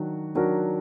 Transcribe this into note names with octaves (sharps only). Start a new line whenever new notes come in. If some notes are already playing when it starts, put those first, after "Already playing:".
Already playing: D#3 F#3 D4 F#4
D#3 F#3 D4 F#4 A#4